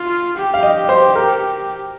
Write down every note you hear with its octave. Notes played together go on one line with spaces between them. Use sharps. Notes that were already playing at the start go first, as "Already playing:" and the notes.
Already playing: F4
G4
F5
D#5
C5
A#4